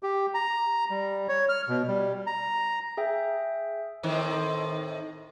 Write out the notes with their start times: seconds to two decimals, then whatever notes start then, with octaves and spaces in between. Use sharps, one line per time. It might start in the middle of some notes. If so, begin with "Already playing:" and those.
0.03 G4
0.34 A#5
0.90 G3
1.28 C#5
1.49 F6
1.69 B2
1.88 G3
2.27 A#5
2.97 G#4 E5 G5
4.03 A2 D#3 C4